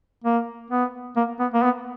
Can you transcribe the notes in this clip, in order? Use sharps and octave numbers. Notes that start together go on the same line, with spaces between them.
A#3
B3
A#3
B3
A#3
B3